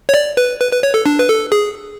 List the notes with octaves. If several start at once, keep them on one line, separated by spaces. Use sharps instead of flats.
C#5
D5
B4
B4
B4
C#5
A4
D4
B4
A4
G#4